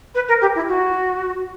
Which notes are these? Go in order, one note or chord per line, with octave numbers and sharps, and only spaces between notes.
B4
A#4
G4
E4
F#4